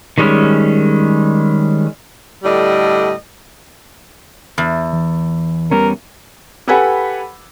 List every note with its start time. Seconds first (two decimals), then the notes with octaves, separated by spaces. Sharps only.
0.18 D#3 G3 G#3 C#4
2.44 A2 D3 G3 D5 D#5
4.58 E2
4.93 E3
5.71 G3 B3 C#4 A#4
6.68 G4 A4 B4 F#5 G#5 B5